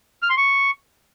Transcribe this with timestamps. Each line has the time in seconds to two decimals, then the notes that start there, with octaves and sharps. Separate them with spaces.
0.23 F6
0.30 C6
0.37 C#6